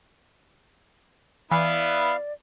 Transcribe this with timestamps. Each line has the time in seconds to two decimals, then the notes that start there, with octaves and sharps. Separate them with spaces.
1.51 E3 B3 E4 B4 D5 F5